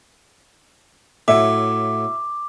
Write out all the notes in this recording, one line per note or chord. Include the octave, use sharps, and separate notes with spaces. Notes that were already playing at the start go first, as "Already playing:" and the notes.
A2 F#3 E5 D6